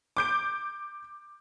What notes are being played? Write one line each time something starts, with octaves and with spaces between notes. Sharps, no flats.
D6 G6 D7